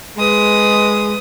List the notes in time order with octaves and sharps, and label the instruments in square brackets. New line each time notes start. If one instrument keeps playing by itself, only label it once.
[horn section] G#3 [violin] B4 D#6